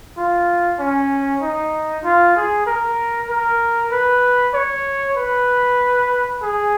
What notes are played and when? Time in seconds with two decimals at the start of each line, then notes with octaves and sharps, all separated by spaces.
0.17 F4
0.79 C#4
1.42 D#4
2.04 F4
2.36 G#4
2.66 A#4
3.29 A#4
3.92 B4
4.54 C#5
5.17 B4
6.42 G#4